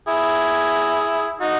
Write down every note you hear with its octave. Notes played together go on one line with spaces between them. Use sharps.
E4 G#4
D#4 F#4